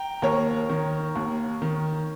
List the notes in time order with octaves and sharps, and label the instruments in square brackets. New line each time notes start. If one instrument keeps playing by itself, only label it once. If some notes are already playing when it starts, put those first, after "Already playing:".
Already playing: [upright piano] G5 A#5
D#2 A#4 C#5
D#3
D#2
D#3